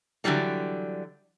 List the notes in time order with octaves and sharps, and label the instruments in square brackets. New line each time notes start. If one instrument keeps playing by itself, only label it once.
[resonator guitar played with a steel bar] D3 E3 F#3 G3 A#3